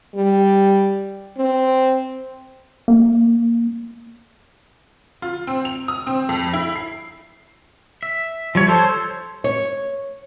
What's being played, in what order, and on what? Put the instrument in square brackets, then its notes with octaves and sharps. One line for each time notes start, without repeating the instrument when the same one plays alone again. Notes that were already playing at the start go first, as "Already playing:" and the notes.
[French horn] G3
C4
[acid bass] A#3
[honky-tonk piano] F4
C4
F7
D#6
C4
F2
E4
C7
[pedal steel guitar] E5
F3 G3 C#5
[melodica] A4 C5 [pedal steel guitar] C#5 C6 G6
[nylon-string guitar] C#5